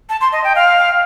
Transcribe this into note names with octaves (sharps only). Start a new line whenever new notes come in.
A5
C6
D#5
G5
F5